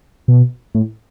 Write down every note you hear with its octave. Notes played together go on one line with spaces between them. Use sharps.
B2
A2